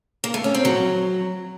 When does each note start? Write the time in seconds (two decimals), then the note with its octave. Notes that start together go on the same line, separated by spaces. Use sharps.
0.24 A#3
0.34 A3
0.44 C#4
0.55 C4
0.65 F#3